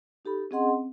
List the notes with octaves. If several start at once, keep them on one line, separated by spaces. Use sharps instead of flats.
D#4 G4 A4 B5
C4 C#4 G#4 D#5 F#5 C6
C4